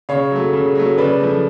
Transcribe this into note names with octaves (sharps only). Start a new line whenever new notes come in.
C#3 C#5 F5
F#3 A3
C#3
F#3 A3
C#3 B4 D5
F3 A3